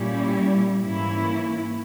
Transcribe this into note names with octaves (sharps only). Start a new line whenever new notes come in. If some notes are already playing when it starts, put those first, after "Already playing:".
Already playing: A#2 G3 C#4 E4
G#2 E3 A#3 C#4 E4